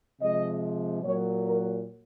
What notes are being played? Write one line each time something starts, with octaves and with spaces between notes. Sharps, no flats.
C3 F3 G#3 D#5
A#2 F#3 C#5
A#4